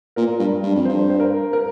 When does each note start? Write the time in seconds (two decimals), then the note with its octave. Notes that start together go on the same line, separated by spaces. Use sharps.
0.16 A#2 A#4
0.39 G2
0.63 G2
0.75 F2
0.85 G2 C5
1.09 C5
1.20 A#4
1.53 A#4